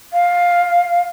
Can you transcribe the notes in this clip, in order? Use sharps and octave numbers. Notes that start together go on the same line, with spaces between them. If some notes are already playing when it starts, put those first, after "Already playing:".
F5